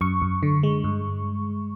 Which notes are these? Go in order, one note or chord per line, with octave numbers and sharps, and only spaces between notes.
F#2 C#6
F#2
D3
G#3
G2